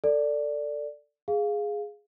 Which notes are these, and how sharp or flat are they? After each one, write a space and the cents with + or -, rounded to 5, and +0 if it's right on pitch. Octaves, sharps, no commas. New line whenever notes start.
A4 +20 D5 +0
G#4 +0 F5 +0